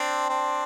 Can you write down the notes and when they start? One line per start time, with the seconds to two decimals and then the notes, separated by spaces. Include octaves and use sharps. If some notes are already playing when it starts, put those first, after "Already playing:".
Already playing: C4 D4
0.29 C4 D4